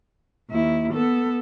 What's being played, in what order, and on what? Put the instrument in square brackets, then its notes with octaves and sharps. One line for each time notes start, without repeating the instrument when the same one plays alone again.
[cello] D#2 E4
B3 A4